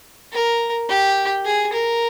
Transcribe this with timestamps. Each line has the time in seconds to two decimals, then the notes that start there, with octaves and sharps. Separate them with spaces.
0.32 A#4
0.89 G4
1.46 G#4
1.73 A#4